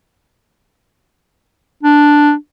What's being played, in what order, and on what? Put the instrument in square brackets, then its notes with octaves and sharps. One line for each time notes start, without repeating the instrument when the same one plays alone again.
[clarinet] D4